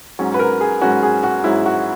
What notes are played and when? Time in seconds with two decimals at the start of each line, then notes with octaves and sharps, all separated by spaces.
0.19 G#2 F#3 C#4
0.34 B4
0.39 A#4
0.61 G#4
0.82 G#2 F#3 C#4 F#4
1.03 G#4
1.24 F#4
1.44 G#2 F#3 C#4 E4
1.66 F#4